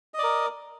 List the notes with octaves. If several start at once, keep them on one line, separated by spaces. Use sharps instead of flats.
A#4 D5 D#5